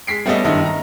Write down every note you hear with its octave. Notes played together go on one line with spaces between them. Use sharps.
G#3 B6 C7 D7
G3 A3 B3 C#4 A4 D#5
F#1 G2 D#3 E4 D#5 E6
A#5